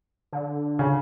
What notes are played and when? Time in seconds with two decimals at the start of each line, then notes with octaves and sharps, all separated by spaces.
0.33 D3
0.79 C#3